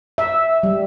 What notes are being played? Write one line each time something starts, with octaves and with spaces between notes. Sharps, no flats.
E5
G3